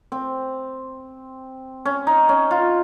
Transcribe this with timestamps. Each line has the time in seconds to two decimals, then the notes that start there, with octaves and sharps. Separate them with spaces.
0.12 C4
1.85 C#4
2.07 D#4
2.29 C#4
2.51 F4